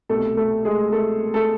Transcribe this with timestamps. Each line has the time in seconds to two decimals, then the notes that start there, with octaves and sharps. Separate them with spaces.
0.09 C2 B2 A3 A4
0.37 A3 A4
0.65 G#3 G#4
0.92 A3 A4
1.34 A3 A4